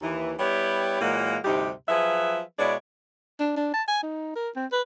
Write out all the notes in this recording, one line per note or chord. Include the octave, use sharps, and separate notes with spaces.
D#2 E3
G3 B3 E4 G4 C#5
A#2 E3 F#3 G#3 A#3
D2 G2 C3 D#4 G4
F3 F#3 G#4 B4 E5
B2 G#3 E4 C#5 D5
D4
D4
A5
G#5
D#4
A#4
C4
B4